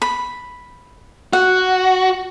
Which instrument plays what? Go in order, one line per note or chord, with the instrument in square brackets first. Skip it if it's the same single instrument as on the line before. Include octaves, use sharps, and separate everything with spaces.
[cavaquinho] B5
[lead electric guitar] F#4 [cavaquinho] F#5